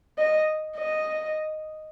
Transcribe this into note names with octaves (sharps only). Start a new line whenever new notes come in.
D#5
D#5